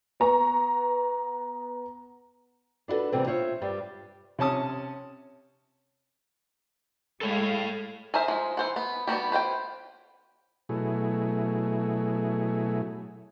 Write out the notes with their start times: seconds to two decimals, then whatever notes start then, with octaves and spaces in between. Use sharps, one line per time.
0.20 B3 A#5 C#6
2.88 D4 E4 F#4 A4 B4
3.12 D2 C3 E3 G3 B3 C4
3.27 F4 C5 C#5 E5
3.61 G2 G3
4.39 C3 C#4 A5 D#6
7.21 G#3 A4 C#5 E5 F5
8.14 G#4 A#4 C5 E5
8.28 F3 G#3
8.57 E3 C5 F#5
8.76 B3
9.07 G3 B3 F#4 G4
9.32 B4 C5 E5 G5
10.69 B2 F#3 A3 E4 G#4